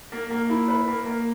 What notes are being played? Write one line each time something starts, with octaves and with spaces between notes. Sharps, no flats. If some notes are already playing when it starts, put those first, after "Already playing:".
A#3
A#3
E4
B4
A#3
A#3